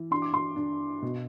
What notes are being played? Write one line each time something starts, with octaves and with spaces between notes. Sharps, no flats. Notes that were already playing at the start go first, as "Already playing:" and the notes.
Already playing: E3
D4 C6
D6
C6
D4
B2